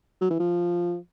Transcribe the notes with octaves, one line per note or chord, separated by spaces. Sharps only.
F#3
E3
F3